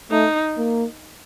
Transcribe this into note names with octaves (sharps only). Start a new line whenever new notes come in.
A3 D#4
A#3